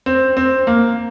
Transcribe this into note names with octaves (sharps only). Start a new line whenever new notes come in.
C4
C4
A#3